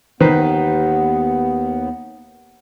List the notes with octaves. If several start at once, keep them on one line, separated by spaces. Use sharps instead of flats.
D#2 D#3 B3 B4 C5